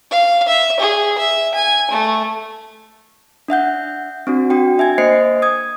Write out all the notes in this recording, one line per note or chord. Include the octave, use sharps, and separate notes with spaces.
F5
E5
G#4
E5
G#5
A3
D4 E5 F#5 G6
C4 D4 F#4
D4 F#4 G5
D4 E5 G#5 G#6
A#3 C5 D#5 C7 C#7
D#6 G#6